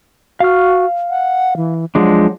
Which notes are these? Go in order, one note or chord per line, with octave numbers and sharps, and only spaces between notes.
F#4 F5 F6
F#5
E3
F3 F#3 G#3 D4